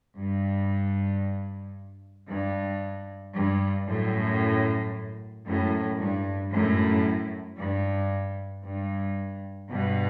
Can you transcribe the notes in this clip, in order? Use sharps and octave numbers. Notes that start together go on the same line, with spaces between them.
G2
G2
G2
F#2 A2
F#2 A2
G2
F#2 A2
G2
G2
G2 B2